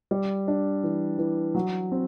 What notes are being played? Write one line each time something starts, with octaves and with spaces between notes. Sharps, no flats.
G3
D4
E3
E3
F#3
C4